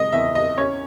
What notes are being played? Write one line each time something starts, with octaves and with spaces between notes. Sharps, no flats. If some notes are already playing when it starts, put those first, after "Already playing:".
Already playing: G#3 D#5
E2 E5
D#5
C#4 C#5